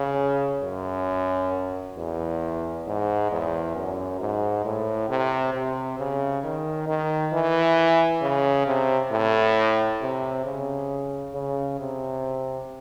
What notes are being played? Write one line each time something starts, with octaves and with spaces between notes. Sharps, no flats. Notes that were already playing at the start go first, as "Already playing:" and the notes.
Already playing: C#3
F#2
E2
G#2
E2
F#2
G#2
A2
C3
C3
C#3
D#3
D#3
E3
C#3
C3
A2
C3
C#3
C#3
C3